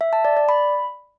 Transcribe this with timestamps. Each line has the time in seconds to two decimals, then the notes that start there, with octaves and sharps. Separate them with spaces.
0.01 E5
0.13 A5
0.25 D5
0.37 D5
0.49 B5